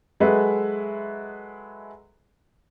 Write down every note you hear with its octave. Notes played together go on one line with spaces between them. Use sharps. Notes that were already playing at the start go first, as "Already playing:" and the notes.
F#3 G#3 G#4 A4 B4 E5